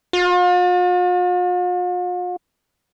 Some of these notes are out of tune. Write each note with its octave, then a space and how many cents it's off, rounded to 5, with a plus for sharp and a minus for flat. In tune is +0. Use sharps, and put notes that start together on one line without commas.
F4 +45